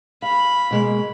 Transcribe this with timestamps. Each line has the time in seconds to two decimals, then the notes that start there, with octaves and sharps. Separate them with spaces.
0.22 F5 B5
0.71 B2 G#3 A#3